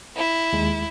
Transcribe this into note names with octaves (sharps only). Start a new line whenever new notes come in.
E4
D#2 G#3